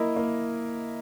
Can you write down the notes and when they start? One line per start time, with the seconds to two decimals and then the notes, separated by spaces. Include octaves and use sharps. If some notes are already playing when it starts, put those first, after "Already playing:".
Already playing: A#3 E4 A#4 D#5
0.16 A#3